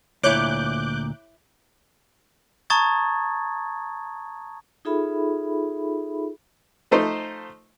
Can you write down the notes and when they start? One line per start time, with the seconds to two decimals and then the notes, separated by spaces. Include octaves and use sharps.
0.23 D2 A#2 E4 C#5 D6 F#6 G6
2.70 A5 A#5 C#6 D#6 G#6 A6
4.85 D#4 F4 G#4 A4 E5 B5
6.91 F3 A3 D#4 C5